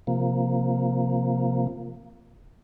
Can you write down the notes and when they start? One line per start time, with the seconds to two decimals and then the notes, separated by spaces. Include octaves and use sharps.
0.07 C3 F3 A#3